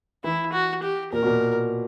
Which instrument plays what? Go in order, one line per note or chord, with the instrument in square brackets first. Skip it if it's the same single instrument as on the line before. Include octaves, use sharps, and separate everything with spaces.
[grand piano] E3 [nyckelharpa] E4
[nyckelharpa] F#4
G4
[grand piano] A#2 [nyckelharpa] A#4
[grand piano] B2
A#2